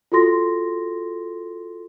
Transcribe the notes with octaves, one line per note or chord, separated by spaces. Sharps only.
F4 F#4 A4 C6 A#6